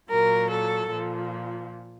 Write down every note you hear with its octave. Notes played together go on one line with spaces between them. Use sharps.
A#2 F#3 A#4
A4
A#2 F3